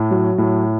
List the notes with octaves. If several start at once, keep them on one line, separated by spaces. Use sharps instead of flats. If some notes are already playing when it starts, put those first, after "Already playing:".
Already playing: A2
F#3
A2